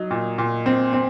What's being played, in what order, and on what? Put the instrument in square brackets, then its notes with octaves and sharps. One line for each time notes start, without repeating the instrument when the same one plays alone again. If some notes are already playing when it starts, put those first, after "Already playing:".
Already playing: [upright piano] F#3 D#4
A#2
A#2
C4
C4